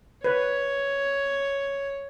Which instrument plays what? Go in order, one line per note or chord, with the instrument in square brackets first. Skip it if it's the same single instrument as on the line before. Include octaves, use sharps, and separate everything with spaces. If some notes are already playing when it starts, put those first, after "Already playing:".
[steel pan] B4 [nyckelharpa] C#5